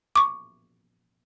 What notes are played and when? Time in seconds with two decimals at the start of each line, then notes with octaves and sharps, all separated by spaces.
0.16 C#6 D6